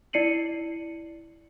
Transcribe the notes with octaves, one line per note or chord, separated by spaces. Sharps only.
E4 D5 C7 C#7 D#7 F#7